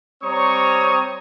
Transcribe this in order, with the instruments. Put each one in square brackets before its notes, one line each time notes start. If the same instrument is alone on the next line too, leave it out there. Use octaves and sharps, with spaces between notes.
[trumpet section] G3 C4 C#5 A#5 C#6 D#6